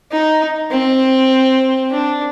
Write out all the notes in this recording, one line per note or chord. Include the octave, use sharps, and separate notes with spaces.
D#4
C4
D4